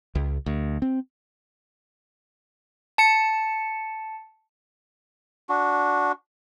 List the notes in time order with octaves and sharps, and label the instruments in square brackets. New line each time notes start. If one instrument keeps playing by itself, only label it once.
[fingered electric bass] C#2
D2
C4
[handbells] A5 C#7
[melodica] D4 F#4